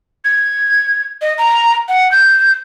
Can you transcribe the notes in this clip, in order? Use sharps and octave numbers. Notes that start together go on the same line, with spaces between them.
G#6
D#5
A#5
F#5
G6